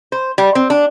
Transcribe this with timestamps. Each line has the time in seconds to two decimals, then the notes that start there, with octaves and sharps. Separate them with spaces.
0.12 C5
0.38 G3
0.55 C4
0.70 D4